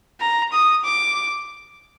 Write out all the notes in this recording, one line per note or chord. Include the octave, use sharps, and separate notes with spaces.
A#5
D#6
D6